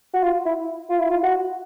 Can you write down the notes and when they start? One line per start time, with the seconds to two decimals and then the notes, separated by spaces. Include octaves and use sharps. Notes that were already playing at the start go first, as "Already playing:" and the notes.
0.13 F#4
0.23 F4
0.45 E4
0.90 F4
0.99 E4
1.10 F4
1.23 F#4